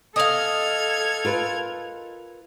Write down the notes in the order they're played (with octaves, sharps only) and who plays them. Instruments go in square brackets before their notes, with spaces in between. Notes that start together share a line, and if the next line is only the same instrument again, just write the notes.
[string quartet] A4 F6 G#6 [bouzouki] D#5 F5
[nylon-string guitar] F4 A#4 B4